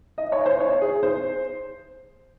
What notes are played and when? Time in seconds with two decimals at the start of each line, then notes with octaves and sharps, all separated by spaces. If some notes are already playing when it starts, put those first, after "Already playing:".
0.18 D#5
0.32 C#5
0.46 C5
0.60 C#5
0.82 G#4
1.03 C5